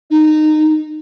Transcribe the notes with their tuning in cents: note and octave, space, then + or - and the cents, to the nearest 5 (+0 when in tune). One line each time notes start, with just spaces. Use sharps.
D#4 -20